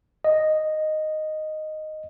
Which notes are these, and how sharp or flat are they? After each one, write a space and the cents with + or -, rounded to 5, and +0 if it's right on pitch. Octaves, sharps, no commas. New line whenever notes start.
D#5 -5